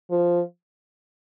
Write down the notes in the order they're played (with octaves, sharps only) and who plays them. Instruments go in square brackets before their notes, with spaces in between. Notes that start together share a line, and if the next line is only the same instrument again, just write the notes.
[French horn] F3